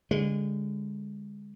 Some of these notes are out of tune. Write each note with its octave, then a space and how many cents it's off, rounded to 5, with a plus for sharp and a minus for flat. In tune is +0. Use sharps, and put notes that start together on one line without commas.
D3 -30 G#3 -30